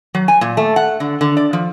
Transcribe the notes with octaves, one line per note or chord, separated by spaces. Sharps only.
F#3
G#5
A#2
A3
F#5
D3
D3
D5
F3